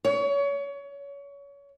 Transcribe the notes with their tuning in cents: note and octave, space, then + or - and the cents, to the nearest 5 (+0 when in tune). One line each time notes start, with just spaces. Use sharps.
C#5 +25